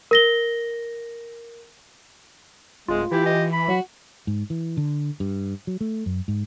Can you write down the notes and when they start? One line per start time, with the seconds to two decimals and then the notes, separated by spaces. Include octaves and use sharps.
0.11 A#4 A#6 G7
2.88 D1 G#3 F4
3.11 E3 E4 G4
3.26 D#5
3.53 B5
3.68 F#3 F#4
4.27 G#2
4.50 E3
4.77 D3
5.20 G2
5.67 F#3
5.81 A3
6.06 F#2
6.28 G#2